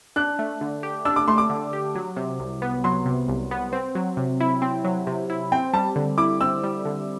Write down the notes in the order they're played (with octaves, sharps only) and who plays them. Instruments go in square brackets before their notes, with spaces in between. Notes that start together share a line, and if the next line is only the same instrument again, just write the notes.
[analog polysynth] D4 [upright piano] F#6
[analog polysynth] A3
D3
G4
[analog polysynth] D4 [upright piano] E6
[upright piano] D6
[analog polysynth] A3 [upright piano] C6
[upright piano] D6
[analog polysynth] D3
G4
F#3
C3
C2
B3
[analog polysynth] F#3 [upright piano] C6
[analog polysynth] C3
C2
B3
C4
F#3
C3
E4
C4
F#3
C3
E4
[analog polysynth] C4 [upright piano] G5
[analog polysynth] G3 [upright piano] A5
[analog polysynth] D3
[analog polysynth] E4 [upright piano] D6
[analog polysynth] C4 [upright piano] E6
[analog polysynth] G3
D3